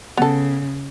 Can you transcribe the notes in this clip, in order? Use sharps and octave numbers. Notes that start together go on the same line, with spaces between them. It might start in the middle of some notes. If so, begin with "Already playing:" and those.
C#3 B3 A4